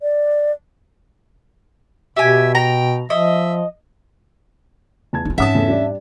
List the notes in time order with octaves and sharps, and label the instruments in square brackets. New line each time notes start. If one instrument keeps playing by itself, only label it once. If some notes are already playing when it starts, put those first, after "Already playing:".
[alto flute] D5
[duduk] B2 [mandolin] G4 G#5 [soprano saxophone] E5
[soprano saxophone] G5 [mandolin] A#5
[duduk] F3 [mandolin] D#5 [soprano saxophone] E5
[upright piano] E2 A5 G#6
[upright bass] D#4 F4
[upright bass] G#2 C4 [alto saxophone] C#4 [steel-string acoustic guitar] E5 A5 [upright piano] F#5 D#6
[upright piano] E2 A4
G3 D4 D5